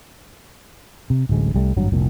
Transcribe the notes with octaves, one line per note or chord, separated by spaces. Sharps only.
C3
D1 A1 D2 G#3
C2 G3 A3
G#1 G2 F#3
F1 C2 A#2